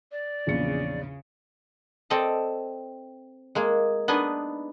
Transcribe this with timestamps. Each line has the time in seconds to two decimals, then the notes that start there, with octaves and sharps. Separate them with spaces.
0.12 D5
0.47 A#1 E2 C#3 C#7
2.10 C4 A4 D5 D#5 A5
3.55 G#3 A#3 G#4
4.08 B3 D4 D#4 B4 D#5 G#5